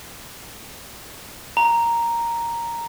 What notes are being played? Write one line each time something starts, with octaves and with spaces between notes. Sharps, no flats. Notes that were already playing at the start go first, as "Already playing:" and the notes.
A#5